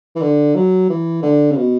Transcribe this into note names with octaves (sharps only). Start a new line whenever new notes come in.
E3
D3
F#3
E3
D3
C#3
B2